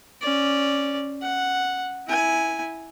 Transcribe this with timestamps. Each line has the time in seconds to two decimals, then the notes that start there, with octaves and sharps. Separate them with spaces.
0.22 C#4 D5
1.22 F#5
2.07 E4 G#5